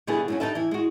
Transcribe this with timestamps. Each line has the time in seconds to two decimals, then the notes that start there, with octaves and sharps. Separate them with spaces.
0.07 B2 D3 G3 B3 E4 G#4
0.28 G#2 F#3 C#4
0.40 D#4 F4 G4 A4 B4 E5
0.55 E3 E4
0.71 G#3 F#4